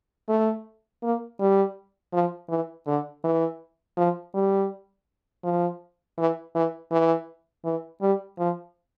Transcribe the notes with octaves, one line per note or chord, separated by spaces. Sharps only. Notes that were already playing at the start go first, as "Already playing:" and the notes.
A3
A#3
G3
F3
E3
D3
E3
F3
G3
F3
E3
E3
E3
E3
G3
F3